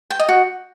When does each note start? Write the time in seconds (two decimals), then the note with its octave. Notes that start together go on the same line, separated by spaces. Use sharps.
0.10 G5
0.19 D#5
0.29 F#4